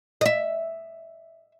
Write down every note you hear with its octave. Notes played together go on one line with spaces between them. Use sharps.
D#5 E5